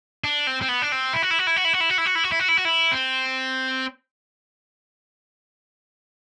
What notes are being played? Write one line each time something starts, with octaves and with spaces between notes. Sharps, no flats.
D4
C4
C4
B3
D4
C4
E4
F#4
E4
F#4
E4
F#4
E4
F#4
E4
F#4
E4
F#4
E4
F#4
E4
F#4
E4
F#4
E4
C4